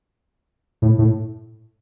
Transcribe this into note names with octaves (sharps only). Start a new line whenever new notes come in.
A2
A2